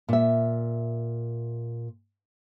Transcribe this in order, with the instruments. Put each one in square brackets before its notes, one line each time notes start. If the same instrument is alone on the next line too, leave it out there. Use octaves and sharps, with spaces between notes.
[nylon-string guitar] A#2 E5